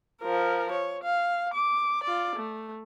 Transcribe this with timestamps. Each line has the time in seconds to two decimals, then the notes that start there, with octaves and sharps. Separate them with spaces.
0.22 F3 A#4
0.72 C#5
1.04 F5
1.54 D6
2.04 F4 D5
2.36 A3